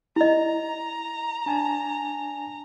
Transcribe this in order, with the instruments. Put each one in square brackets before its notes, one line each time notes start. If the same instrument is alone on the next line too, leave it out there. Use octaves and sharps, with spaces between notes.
[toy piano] E4 D#5 [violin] A#5
[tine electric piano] D4 G#5 A5